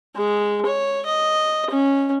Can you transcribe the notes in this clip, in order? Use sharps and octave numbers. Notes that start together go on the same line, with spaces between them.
G#3
C#5
D#5
C#4